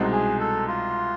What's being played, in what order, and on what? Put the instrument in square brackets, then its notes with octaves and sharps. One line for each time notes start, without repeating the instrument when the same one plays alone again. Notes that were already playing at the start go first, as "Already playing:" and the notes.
Already playing: [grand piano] C2 B2 G#3 C4 D#4
[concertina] G#4
A4
F4